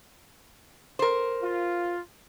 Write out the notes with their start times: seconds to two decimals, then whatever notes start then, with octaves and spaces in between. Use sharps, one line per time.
0.99 A#4 C5
1.41 F4